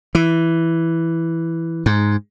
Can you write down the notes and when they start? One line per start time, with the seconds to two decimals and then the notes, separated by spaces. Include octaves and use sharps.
0.15 E3
1.86 G#2